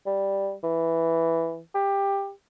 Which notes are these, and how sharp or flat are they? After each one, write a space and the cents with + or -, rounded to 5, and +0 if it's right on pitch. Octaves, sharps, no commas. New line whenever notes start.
G3 +0
E3 +0
G4 +15